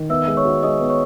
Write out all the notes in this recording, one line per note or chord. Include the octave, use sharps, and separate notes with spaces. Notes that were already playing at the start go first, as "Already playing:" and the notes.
Already playing: D#3
B3 E5 E6
G#3
C#5 C#6
F#4
G#3 D#5 D#6
B3
C#5 C#6